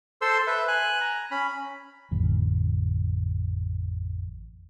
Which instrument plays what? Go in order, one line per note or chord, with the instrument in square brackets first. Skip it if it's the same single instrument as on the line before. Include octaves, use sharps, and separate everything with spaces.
[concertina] A4 C5 C6 E6
B4 E5
G#5 F#6
A#5
C#4 B5
[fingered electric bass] A1 F2 D3 F#3